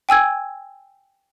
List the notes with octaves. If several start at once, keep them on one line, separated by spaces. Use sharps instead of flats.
G5 G#5 E6 G#6